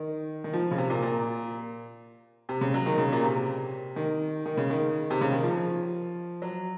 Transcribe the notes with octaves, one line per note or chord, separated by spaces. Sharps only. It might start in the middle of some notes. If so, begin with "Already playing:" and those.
Already playing: D#3
D#3
F3
C#3
C3
A#2
A#2
C3
C#3
F#3
D#3
C#3
A#2
C3
D#3
D#3
C#3
D#3
C3
C#3
D#3
F3
F#3